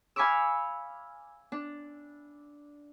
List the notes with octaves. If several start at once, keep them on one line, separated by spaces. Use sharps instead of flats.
F5 G#5 B5 C#6 D6 E6
D4